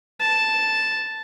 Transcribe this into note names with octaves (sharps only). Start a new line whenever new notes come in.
A5